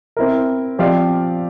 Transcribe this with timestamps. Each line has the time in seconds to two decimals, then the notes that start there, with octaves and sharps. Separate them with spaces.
0.17 C4 E4 A#4
0.79 F3 C4 G4 D5 F5